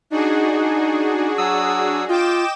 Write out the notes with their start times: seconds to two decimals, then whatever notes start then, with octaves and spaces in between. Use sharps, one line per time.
0.11 D4 D#4 F#4 G#4
1.38 F#3 D#6 E6
2.09 F4 D#5 G5 D6 E7